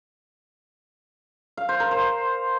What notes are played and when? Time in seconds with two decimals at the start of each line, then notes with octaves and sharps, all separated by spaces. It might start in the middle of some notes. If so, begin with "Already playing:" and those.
1.57 F5
1.69 C5
1.80 A#4
1.91 C5